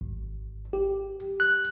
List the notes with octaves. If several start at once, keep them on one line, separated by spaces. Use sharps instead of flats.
G#1
G4
F#6